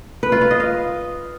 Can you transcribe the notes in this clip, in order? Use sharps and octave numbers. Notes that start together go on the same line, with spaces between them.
B4
F4
F5
D#5
F5